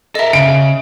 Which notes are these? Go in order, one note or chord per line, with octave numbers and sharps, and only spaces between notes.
A4 A#4 D#5 E5
C#3 D7